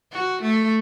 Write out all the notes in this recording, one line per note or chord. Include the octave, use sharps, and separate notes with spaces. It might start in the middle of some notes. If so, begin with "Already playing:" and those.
F#4
A3